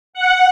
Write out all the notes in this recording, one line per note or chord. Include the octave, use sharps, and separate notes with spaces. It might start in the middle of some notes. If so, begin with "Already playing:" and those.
F#5